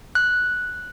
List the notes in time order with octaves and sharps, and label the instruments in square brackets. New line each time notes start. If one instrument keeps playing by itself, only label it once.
[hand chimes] F#6